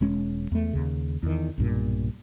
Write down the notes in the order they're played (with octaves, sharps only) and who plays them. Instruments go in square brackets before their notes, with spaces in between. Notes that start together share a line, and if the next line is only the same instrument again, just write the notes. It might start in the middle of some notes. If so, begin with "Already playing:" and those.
[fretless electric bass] E1 G#3 C#4
E2 A3
D#2 C#3
E2 D#3
B1 G2 A#2